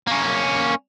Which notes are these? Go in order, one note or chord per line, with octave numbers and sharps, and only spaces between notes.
A#3 C#4